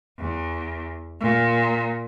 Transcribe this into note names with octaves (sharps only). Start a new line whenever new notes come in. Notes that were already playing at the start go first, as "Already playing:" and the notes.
E2
A#2